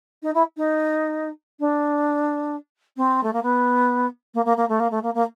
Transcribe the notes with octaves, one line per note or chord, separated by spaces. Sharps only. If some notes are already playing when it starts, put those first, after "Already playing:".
D#4
E4
D#4
D4
C4
A3
A#3
B3
A#3
A#3
A#3
A3
A#3
A3
A#3
A#3